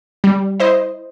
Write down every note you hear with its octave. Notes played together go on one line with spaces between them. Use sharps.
G3
E4 C5 D#5